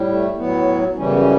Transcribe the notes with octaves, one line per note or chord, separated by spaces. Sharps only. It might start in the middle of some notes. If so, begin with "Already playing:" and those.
Already playing: A2 G3
A3
A2 F#3 B3
F#2 C#3 E3 G3 C#4
B3
C#4